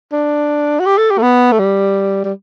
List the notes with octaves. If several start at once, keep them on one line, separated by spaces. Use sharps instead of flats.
D4
F#4
G4
A4
G4
A3
B3
A3
G3
G3